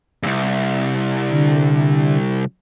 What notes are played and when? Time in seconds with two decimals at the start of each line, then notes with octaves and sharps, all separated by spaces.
0.23 C2 G2
1.30 D3